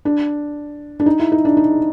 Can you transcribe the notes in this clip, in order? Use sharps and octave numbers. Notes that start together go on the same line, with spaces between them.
D4
D4
D#4
E4
D#4
D4
D#4